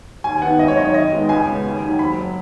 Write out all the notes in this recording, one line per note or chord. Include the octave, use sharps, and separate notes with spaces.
D#2 G#5
D#3 B3 F#5
G#1 D#5
C#5
F#2 D#3 D#5
C#5
D#2 D#5
D#3 G#3 B3
C#2 G#5
C#3 G#3 B3
D#2
D#3 F#3
F#1 B5
F#3